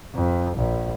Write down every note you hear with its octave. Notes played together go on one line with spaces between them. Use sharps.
F2
A#1